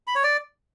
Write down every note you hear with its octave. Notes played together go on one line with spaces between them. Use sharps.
B5
C#5
D5